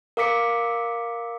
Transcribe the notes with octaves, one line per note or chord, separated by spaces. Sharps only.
A#4 F5 D6 B6 C#7